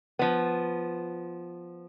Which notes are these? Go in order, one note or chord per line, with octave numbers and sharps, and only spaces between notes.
F3 B3